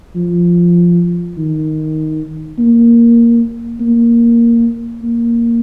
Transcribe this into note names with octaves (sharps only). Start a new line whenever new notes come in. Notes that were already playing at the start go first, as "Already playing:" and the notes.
F3
D#3
A#3
A#3
A#3